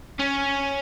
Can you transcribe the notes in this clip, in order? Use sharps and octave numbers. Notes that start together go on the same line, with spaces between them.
C#4